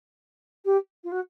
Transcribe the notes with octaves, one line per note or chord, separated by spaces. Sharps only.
G4
F4
F#4